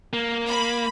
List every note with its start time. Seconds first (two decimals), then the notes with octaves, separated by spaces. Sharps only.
0.13 A#3
0.48 B5